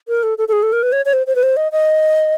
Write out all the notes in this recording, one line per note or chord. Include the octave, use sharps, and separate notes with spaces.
A#4
A4
A4
A4
G#4
A4
A#4
B4
C#5
C#5
C5
C5
B4
C5
D#5
D#5